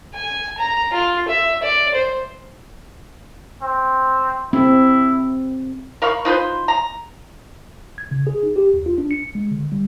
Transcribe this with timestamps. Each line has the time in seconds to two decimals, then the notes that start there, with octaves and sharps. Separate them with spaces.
0.14 G#5
0.57 A#5
0.93 F4
1.28 E5
1.62 D5
1.94 C5
3.62 C4
4.53 C4 E4
6.02 A#4 F5 B5 C#6
6.25 D#4 F4 B4 C5
6.68 A#5
7.98 G#6
8.11 C#3
8.27 G#4
8.43 D#4
8.56 G4
8.74 D#2
8.86 F4
8.98 D4
9.11 C#7
9.35 G#3
9.51 D3
9.72 G3